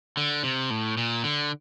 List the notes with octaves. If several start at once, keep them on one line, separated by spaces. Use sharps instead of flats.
D3
C3
A2
A#2
D3